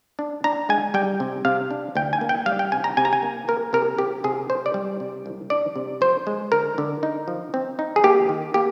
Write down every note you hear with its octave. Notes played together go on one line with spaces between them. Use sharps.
D4
D4 A#5
G#3 G#5
G3 G5
C3
C3 F5
D4
D2 G5
G#5
A#3
G5
G3 F5
G5
C3 G#5
A#5
C3 G#5
A#5
G#5
A#3
A#3 A#4
C3 A#4
C3 G4
C3 G#4
C3 C5
D5
G3
C3
C2
D4 D5
C3
F3 C5
G#3
D3 A#4
D3
D#4
F3
C4
D#4
G#4
A#3 G4
D#3
A#3 G4